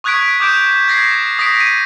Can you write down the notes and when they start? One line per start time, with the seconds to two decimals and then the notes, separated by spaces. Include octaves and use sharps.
0.04 C#6 D#6 F#6 G#6 B6 D7
0.40 D6 D#6 G6 D7 E7
0.88 G#6 A#6 C7
1.39 D#6 A#6 B6 D7
1.60 D#7